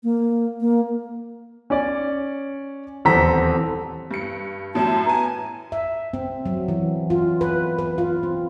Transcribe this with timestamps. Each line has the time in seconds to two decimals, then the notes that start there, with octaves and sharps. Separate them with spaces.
0.03 A#3
0.60 A#3
1.70 C#4 C#5 D5
3.05 D#1 E2 C4 A4 A#5 B6
4.11 G2 C#7
4.74 F#2 A2 F#3 A5
5.05 B3 G#5 A#5
5.72 E5
6.13 C4
6.46 F#3
6.68 E3
7.10 F4
7.41 B4
7.79 B4
7.98 F4
8.23 C4